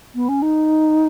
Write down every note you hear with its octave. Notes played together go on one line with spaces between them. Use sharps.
B3
C#4
D#4